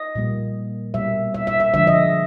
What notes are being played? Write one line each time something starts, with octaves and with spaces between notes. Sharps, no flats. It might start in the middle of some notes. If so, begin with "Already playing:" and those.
Already playing: D#5
A#2 G3 A#3
B2 G3 A#3 E5
E5
E5
E5
D3 F3 G#3 E5
D#5